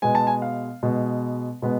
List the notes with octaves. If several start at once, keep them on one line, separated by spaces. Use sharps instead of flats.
B2 G#3 B3 G#5
A5
G#5
F5
B2 G#3 B3
B2 G#3 B3